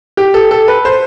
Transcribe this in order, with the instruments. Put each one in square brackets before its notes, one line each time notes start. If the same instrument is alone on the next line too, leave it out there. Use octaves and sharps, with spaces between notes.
[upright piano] G4
A4
A4
B4
C5